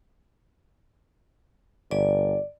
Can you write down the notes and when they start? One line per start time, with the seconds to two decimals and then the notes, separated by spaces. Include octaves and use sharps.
1.91 G1 D5